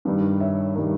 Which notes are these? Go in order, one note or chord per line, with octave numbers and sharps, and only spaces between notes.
G2 D#3 G3
C#5 E5
D#3 G3 A#4 C#5